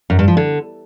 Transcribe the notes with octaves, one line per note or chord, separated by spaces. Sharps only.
F#2
G2
F3
D3